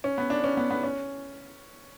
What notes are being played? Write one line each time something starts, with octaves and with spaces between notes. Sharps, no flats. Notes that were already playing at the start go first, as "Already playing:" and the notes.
C#4
B3
D4
C#4
B3
B3
C#4